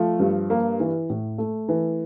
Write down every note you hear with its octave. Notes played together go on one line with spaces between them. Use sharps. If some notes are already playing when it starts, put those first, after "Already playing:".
Already playing: F3 A3
G2
A#3
E3
A2
A3
E3